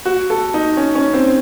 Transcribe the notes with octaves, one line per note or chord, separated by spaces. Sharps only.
F#4
A4
D#4
C#4
C#4
C4